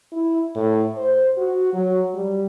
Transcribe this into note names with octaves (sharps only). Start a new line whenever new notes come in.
E4
A2
C5
F#4
F#3
G3